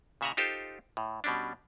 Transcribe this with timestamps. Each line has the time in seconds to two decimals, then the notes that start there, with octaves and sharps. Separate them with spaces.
0.21 A#2 C#3 E5 F#5 G#5 A#5
0.37 D#4 F4 G4 A4 C5
0.97 A2
1.24 B2 G3 C#4 D4